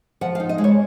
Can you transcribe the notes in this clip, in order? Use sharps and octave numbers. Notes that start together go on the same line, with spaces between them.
F3 F#5
F5
D#4
D#5
G#3
C#5